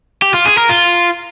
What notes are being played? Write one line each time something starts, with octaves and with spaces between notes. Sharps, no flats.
G4
F4
G#4
A#4
F4